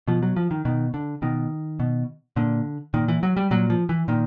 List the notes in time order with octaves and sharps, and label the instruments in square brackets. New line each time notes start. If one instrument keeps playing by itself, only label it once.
[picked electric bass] B2 F3
F#3
F3
D#3
B2 D#3
D3
B2 D#3
B2
A#2 D3
A#2 D#3
E3
F#3
G3
A#2 F#3
F3
E3
A#2 D#3